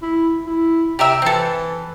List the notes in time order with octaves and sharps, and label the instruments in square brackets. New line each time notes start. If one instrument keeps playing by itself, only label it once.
[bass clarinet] E4
E4
[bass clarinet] C3 [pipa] G4 A#4 E5
[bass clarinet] E3 [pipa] C4 A4